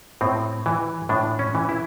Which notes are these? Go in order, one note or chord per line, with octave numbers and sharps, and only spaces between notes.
A2 C4
E3
A2 D4
C#4
E3
E4